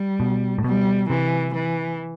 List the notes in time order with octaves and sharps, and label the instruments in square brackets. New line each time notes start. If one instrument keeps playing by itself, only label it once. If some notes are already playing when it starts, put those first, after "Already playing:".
Already playing: [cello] G3
[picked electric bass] B2
A2
[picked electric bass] B2 [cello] G3
[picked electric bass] C3 [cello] E3
[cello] E3